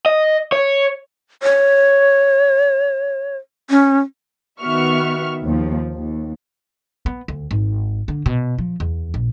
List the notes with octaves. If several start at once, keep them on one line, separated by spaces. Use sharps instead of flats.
D#5
C#5
C#5
C#4
D#3 B3 F#4 E5 C#6 F6
D#2 F3
D#2
B3
D2
G#1
D3
B2
F3
E2
A#1